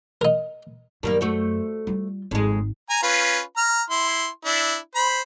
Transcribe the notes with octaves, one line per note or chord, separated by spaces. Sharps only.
D#4 A#4
F#2 D#3 G3 A#3
A3 F#4 C5
G3 F4
G#1 F2 G#3
G#5 A#5
C#4 F4 B4
A#5 F6
E4 C6
D4 E4
C5 B5